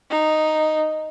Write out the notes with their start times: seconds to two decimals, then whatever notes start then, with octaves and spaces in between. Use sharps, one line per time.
0.11 D#4